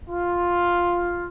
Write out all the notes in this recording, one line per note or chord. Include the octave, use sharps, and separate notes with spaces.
F4